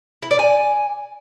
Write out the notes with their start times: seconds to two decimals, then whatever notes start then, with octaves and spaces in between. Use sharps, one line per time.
0.22 E4
0.31 D5
0.39 G#5